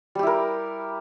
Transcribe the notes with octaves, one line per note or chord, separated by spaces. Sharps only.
G3 E4 G4 A#4